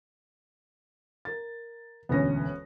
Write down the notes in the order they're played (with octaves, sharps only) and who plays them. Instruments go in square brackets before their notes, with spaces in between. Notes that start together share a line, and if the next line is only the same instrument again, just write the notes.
[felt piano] A#4 A6
[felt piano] E1 D2 A#6 [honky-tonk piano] B3 C#4